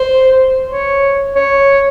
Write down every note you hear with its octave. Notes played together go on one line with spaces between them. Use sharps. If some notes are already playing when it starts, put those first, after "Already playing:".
Already playing: C5
C#5
C#5